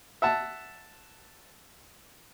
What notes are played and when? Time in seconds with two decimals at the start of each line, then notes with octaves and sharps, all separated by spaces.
0.22 E5 F#5 A5